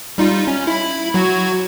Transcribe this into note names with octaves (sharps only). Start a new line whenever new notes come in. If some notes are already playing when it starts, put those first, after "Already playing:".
G3 D#4 F4
C#4
E4 B5
F#3 F#4 G#6